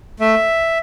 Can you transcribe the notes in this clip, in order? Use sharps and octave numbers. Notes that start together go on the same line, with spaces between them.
A3 E5